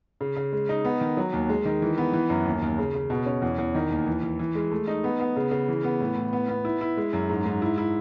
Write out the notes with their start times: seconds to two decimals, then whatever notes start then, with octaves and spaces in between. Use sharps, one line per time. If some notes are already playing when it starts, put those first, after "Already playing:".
0.21 C#3
0.36 C#3
0.53 G#3
0.69 D#4
0.85 B3
1.01 D#3
1.17 F#3
1.33 D#2
1.49 G#3
1.65 D#3
1.82 E3
1.98 B3
2.13 E3
2.30 F#2
2.45 D#2
2.62 D#2
2.79 C#3
2.95 C#3
3.10 B2
3.26 C#4
3.42 E2
3.58 E2
3.75 D#3
3.91 D#2
4.07 E3
4.23 E3
4.39 E3
4.55 G#3
4.71 A3
4.87 D#4
5.04 B3
5.20 B3
5.36 C#3
5.51 C#3
5.68 E3
5.84 B3
6.00 A2
6.16 A2
6.33 B3
6.49 B3
6.65 E4
6.81 E4
6.97 G#3
7.13 F#2
7.30 G#2
7.46 G#2
7.62 E4
7.78 E4